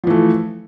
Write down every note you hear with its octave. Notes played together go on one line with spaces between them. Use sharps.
E3 F3 A3